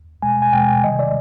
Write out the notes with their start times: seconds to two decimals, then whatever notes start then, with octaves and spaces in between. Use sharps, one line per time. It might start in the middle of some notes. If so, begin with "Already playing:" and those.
0.22 B2 G#3 G#5
0.42 G#5
0.53 B2 G#3 G5
0.84 C3 D#3 G3 D#5
0.99 D5